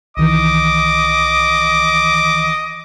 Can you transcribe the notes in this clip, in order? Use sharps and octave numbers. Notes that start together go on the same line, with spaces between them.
C2 D#3 E3 D#5 D6